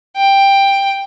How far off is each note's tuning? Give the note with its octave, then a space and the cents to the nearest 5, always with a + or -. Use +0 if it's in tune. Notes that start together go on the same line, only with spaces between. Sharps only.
G5 +10